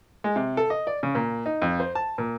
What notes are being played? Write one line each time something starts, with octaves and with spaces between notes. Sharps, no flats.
G#3
C3
A4
D#5
D5
C#3
A#2
D#4
F2
C5
A5
A#2